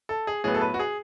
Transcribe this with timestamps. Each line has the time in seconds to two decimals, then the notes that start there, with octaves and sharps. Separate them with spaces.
0.09 A4
0.27 G#4
0.44 A2 F#3 B3 G#4
0.54 A4
0.61 B4
0.74 F#4
0.79 G#4